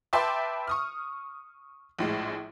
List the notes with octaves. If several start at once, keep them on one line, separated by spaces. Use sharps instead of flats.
B4 E5 G5 A5 C6 D6
C#6 D#6 F6
A#1 A2 G#3